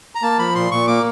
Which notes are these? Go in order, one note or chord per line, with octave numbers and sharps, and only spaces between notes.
A#5
A#3 A5
F3 B5
A#2 C6
A#2 C#6
A#3 D6